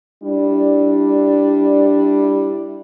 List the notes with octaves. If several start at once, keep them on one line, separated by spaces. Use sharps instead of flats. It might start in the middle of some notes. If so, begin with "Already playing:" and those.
G3 D4 E4